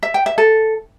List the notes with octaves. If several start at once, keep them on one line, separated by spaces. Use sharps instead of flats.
E5
G5
E5
A4